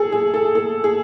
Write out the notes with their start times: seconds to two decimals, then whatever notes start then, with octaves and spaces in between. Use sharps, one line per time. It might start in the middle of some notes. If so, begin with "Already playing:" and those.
Already playing: G#4 A4
0.12 G#4
0.34 A4
0.55 A4
0.84 G#4